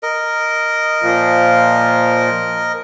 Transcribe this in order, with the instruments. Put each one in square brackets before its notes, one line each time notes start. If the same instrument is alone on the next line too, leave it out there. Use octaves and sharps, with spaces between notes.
[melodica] A#4 D#5
[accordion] A#2 F3